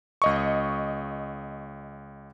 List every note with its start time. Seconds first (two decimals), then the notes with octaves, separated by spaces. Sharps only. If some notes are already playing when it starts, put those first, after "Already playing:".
0.22 C#2 D#5 C#6